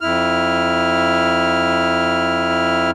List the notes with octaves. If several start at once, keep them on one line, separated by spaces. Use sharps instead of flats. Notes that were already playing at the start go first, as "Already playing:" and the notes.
F2 E4 F6